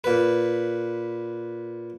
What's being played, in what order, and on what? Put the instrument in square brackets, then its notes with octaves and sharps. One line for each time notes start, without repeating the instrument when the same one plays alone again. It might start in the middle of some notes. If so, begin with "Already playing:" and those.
[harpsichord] A#2 B4